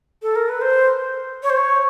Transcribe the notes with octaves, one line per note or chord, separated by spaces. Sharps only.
A4
A#4
B4
C5
C#5
C5
C#5